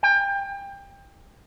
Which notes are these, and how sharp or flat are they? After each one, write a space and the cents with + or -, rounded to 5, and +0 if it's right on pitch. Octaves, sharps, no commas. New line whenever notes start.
G5 +25